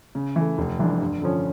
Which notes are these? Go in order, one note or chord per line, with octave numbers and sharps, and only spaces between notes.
C#3
E3 A3
F1
F2 E3 G3 D4
G2
D3 F3 C#4